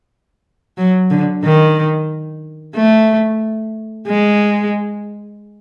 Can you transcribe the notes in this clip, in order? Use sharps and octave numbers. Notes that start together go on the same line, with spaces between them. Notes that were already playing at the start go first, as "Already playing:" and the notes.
F#3
D3
D#3
A3
G#3